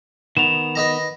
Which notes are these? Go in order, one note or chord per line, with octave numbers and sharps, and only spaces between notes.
D#3 B3 E7 F7
B4 D#5 A#5